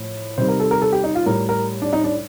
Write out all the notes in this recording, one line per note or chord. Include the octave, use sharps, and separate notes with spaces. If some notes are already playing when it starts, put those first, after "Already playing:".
Already playing: A2 F3
C3 D#3 G3 C5
A#4
A4
A#4
A4
G4
D#4
F4
A2 G3 A#4
A#4
D4
D#4
D4